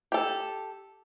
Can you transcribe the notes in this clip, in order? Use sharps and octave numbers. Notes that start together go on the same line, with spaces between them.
G4 A4